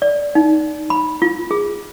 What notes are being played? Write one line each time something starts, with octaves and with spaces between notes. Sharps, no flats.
D5
D#4
B5
F4
G#4